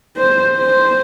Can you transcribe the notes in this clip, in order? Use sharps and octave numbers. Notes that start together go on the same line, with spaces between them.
C5
C5